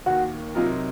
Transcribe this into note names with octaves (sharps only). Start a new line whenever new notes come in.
D#2 D#3 A#3 F#4
C3 F#3 C4 D#4 F4 A#4